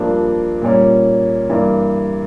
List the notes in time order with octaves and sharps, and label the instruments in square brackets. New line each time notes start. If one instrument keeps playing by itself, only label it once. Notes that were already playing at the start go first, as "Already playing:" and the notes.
Already playing: [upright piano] G2 F3 A#3 D4
A#2 G3 A#3 C#4
G2 E3 G3 A#3